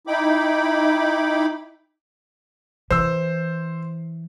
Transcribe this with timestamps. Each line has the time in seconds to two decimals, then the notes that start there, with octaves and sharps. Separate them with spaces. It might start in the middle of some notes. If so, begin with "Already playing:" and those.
0.07 D#4 E4 G5 B5 D6
2.90 E3 C5 E6